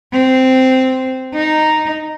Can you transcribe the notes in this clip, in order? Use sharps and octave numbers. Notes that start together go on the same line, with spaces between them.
C4
D#4